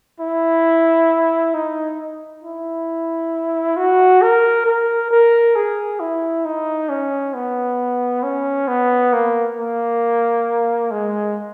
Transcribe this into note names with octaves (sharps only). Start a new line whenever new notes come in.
E4
D#4
E4
F#4
A#4
A#4
A#4
G#4
E4
D#4
C#4
B3
C#4
B3
A#3
A#3
G#3